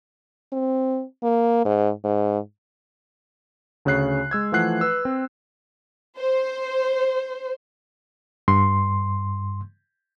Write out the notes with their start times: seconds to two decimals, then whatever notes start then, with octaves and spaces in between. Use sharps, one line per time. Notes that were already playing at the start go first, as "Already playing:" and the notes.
0.52 C4
1.23 A#3
1.65 G#2
2.04 G#2
3.85 D2 C#3 C#5 F#6 C7
4.31 G#3 E6 G#6
4.52 E3 F3 A3 F#5 F#6 C7
4.81 B4 E6
5.05 C4
6.18 C5
8.48 G2 C6